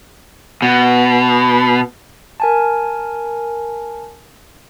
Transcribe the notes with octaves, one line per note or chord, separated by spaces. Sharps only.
B2
A#4 G#5 A5